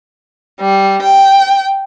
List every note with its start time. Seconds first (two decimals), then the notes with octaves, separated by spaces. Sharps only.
0.60 G3
1.01 G5